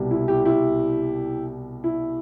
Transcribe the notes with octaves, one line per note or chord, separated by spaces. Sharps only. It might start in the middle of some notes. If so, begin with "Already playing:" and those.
Already playing: C2 B2 G3
E4
E4 G4
E4 G4
E4